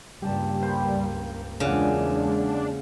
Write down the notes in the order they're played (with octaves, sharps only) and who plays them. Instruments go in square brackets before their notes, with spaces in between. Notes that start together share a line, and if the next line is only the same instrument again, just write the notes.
[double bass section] C#2 G2 A#3 [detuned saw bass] G3 [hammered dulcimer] G4 A5
[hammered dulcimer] C5 G5 B5
[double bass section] E2 G#3 [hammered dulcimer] A#2 D5 F#5 [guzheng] C#3 [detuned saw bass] D4